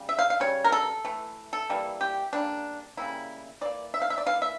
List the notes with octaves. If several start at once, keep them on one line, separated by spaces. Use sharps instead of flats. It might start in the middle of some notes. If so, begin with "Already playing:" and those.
Already playing: C#3 G3
E5
F5
F5
C#3 G3 C#5
A#4
A4
E3 A3
A4
E3 G3 A#3
G4
C#3 G3 A#3 D4
C#3 G3 A#3 E4
E3 A#3 D5
E5
F5
E5
D5
E3 A#3 F5
E5